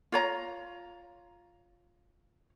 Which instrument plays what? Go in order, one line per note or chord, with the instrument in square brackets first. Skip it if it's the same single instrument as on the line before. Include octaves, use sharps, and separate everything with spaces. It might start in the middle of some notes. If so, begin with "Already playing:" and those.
[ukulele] F4 C#5 A#5